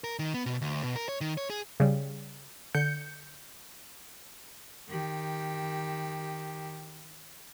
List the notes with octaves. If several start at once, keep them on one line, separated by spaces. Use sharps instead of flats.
A#4
D#3
B3
B2
D2
B2
A#4
C#5
D#3
C#5
G#4
C#3 G3
D3 G6 C#7
D#3 G4